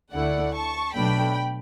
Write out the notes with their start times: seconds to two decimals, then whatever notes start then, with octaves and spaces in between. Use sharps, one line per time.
0.12 D2 D3 A3 E4 D5 F#5
0.54 A5 C#6
0.94 B1 B2 F#3 A3 D4 G5 B5